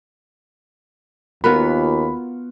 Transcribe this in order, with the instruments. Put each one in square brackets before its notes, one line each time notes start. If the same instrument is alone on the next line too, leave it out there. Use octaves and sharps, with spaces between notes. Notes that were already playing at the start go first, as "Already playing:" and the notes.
[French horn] D#2 [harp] B3 F4 F#4 [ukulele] A#4 [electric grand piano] B5